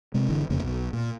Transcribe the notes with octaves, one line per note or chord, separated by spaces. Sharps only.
C3 G#3
G1 D3 E3
E1 F2 C#3 A#3
B1
A#2